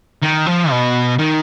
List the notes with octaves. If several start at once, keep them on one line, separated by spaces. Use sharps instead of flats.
D#3
F3
B2
D#3